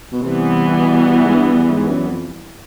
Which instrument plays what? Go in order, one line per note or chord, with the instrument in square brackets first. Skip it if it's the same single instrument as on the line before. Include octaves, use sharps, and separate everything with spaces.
[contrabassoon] B2
[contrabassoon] C3 [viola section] E3 G3 B3
[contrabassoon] B2
G#2
G2
E2
G#2
F#2
F2